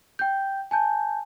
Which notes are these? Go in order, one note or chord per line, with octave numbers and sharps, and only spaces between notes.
G5 G6
G#5 A5 G6